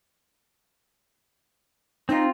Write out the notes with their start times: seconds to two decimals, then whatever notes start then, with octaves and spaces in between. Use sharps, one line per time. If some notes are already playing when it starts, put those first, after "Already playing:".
2.09 C4 D#4 F4